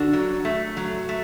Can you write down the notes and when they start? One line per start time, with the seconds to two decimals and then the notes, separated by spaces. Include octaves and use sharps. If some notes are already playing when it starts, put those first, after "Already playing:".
Already playing: D3 D4 F#4
0.13 F#3
0.45 A3
0.77 F#3
1.09 A3